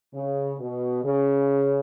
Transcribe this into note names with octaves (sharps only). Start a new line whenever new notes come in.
C#3
B2
C#3